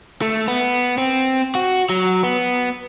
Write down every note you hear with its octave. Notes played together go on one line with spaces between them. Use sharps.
A3
B3
C4
F#4
F#3
B3